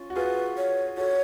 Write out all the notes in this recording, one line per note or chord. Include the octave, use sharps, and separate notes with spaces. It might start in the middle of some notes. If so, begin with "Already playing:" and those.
Already playing: C#4 F4
F#4
F4 G#4 B4
C#5
F#4 A4 C#5